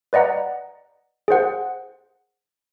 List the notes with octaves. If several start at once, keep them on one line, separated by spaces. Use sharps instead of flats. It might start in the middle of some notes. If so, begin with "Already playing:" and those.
B4 D5 D#5 F#5 A#5
G#4 A#4 C5 F#5